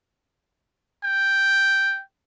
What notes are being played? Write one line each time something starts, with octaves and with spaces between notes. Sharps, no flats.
G5